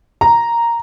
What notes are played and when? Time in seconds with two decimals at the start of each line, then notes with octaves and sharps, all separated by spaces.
0.21 A#5